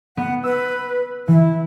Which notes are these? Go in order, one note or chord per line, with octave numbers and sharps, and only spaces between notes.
B3 F#5
B4 E6
E3 E4